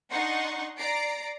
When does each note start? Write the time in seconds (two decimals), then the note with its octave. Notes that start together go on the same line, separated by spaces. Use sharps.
0.11 D4 D#4 F#5 C6 C#6
0.78 D5 A#5 C7 D7